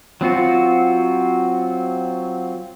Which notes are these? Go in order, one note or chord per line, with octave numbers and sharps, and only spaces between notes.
F#3 C4 F4 F#4